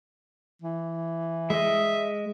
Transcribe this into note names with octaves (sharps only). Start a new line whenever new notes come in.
E3
G#3 D#5 E5